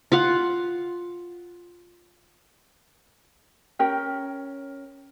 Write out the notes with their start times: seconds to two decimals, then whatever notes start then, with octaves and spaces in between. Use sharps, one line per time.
0.12 F4 F5 F#5
3.79 C#4 A#4 G5